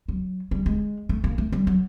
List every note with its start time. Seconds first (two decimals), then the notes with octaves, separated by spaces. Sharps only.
0.08 F#3
0.51 G3
0.66 G#3
1.09 A3
1.24 A#3
1.38 A3
1.52 G3
1.67 F#3